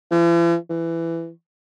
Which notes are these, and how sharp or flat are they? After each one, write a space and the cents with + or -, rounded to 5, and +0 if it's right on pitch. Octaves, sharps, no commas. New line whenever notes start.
E3 +45
E3 +15